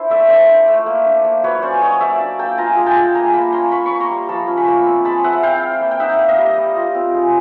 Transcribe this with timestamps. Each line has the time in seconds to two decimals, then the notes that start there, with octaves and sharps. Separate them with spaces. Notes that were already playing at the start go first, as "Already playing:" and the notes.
Already playing: D4 E4 C5
0.10 A3 D5 E5
0.29 D4 C5 D5
0.49 D4
0.68 A3
0.86 A#3
1.06 D4
1.24 A#3
1.43 F#3 B4 C#5
1.62 C#4 C5 D5
1.81 F#3 C#5 D#5
2.00 A#3 D5 E5
2.20 D4
2.39 A#3 G5 A5
2.58 F4 G#5 A#5
2.77 G#3
2.86 G5 A5
2.96 G#3
3.15 A#3 G#5 A#5
3.33 A#3 A5 B5
3.52 C#4 A#5 C6
3.72 A#3 B5 C#6
3.86 B5 C#6
3.91 A#3
4.00 A#5 C6
4.10 G3
4.29 F3 A5 B5
4.47 C#4
4.57 B5 C#6
4.68 A#3
4.85 C4
5.05 G#3 A5 B5
5.24 C4 E5 F#5
5.43 E4 F5 G5
5.62 E4
5.81 A#3
5.91 G5
6.00 D#4 E5 F#5
6.19 A#3
6.28 D#5 F5
6.38 G3
6.58 G3
6.76 F4
6.95 C4
7.14 G#3